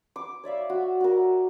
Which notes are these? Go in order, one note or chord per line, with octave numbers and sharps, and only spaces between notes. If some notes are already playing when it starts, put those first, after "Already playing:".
D6
C#5 D5 E5 F5
F#4
F#4 A#4